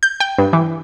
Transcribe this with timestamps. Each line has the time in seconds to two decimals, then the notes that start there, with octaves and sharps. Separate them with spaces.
0.03 G6
0.20 G5
0.38 G2
0.53 E3